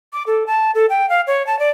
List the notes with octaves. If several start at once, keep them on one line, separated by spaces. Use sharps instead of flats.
D6
A4
A5
A4
G5
F5
C#5
A5
D5